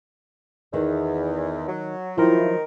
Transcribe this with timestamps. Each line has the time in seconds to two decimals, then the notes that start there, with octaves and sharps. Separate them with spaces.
0.73 E2 D#3
1.68 F#3
2.18 D#3 F3 F#3 E4 F4 A#4